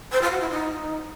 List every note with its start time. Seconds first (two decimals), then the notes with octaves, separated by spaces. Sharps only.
0.12 C5
0.22 F4
0.31 F#4
0.41 E4
0.50 D#4